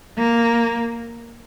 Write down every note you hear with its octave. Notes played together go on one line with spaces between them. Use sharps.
A#3